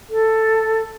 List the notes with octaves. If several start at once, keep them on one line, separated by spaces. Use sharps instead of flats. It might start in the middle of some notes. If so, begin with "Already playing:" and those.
A4